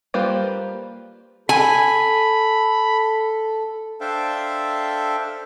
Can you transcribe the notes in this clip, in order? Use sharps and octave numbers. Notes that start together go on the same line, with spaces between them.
G3 A#3 F4 B4 C5
A4 G#5 B5
D4 A4 C5 E5 F5 G5